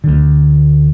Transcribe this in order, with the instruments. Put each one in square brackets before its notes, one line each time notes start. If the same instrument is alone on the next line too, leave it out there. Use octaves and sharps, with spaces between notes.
[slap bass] D2 D3